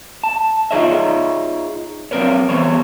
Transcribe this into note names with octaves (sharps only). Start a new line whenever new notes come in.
A5
D#4 F4 G#4 C#5 D#5 E5
F#3 C4 A#4 B4 C#5
E3 G3 B3 C5 C#5